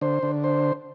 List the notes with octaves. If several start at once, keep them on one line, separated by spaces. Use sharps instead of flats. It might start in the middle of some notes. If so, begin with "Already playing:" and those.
D3 C5
D3
C5